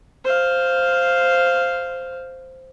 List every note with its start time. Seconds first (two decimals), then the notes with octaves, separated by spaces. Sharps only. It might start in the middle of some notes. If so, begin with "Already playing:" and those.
0.25 C5 F5